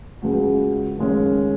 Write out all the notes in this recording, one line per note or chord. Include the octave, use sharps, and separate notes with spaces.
C#2 C#3 G#3 F#4
D#2 C#3 G#3 C#4